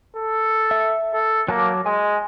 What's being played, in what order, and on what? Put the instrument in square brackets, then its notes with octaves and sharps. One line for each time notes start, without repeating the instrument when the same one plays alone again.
[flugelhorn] A4
[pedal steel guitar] E5
[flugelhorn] A4
[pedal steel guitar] F#3 A5 D6 [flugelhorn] A#3
[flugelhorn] G#3 [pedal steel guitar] G#5